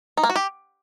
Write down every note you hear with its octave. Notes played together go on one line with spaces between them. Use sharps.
D#4
A#3
F#4
G4